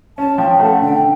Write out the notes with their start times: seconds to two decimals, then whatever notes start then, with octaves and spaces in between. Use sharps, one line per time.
0.17 C#4 A5
0.38 F3 G5
0.60 A3 F#5
0.82 D3 G5